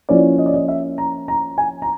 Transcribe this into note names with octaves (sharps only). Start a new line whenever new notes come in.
F3 A#3 C#4 E4 D5
D#5
D5
D#5
E5
A#5
A#5
G#5
A#5